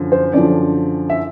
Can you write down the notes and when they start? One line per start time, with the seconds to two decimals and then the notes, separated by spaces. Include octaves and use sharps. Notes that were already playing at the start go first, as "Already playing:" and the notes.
Already playing: F#2 D3 F3
0.12 C5
0.33 F#2 D3 F3 D5
1.10 E5